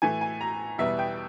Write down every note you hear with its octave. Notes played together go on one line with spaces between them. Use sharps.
A2 E3 A3 G#5
G#5
A#5
E2 B2 G3 B3 E5
G5